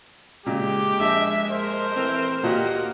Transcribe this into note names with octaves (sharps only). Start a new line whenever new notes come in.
A#2 C#3 G#3 G4
A#1 G#4 D#5 E5
A#4 C5
E3 A3 C4
D2 A#2 A#3 F#4 G4 D#5 F#5